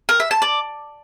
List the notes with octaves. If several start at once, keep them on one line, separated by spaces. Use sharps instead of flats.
A#4
E5
A5
D5